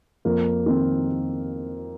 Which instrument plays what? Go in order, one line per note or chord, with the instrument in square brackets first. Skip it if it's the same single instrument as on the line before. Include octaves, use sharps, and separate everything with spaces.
[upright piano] F2 [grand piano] A#3
[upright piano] D#3 C4 D#4